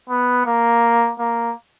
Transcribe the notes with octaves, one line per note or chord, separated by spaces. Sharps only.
B3
A#3
A#3